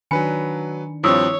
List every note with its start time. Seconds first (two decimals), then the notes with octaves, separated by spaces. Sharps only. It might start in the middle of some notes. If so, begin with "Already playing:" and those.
0.11 D#3 F#3 D4 B4 G#5 B5 C#7
1.04 G2 F3 C4 E4 C#5 D#6 E6